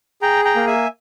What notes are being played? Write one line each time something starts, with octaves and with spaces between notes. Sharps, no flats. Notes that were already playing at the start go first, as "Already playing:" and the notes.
G#4 G5 A#5
G5 A#5
A#3
E5 G#5